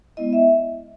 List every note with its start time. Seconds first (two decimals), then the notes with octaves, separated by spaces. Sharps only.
0.17 G#3 B3 E4 D#5
0.33 E5